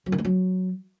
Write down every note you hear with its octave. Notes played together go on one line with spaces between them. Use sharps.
F#3
D#3
A3
F#3